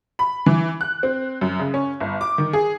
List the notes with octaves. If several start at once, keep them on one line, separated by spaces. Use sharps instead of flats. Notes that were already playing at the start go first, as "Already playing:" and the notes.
B5
E3
F#6
C4
F#2
C#3
C#4
G1
D6
D#3
G#4